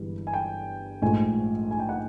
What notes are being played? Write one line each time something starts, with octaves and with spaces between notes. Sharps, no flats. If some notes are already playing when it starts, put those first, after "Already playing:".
Already playing: G1 G2 E3 G#3
G#5
G5
A#1 G#2 F3 A3 G#5
G#5
G5
F#5